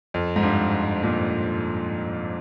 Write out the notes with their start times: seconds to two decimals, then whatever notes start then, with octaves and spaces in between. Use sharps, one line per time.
0.14 F2
0.36 G#2
0.43 G2
1.03 A#2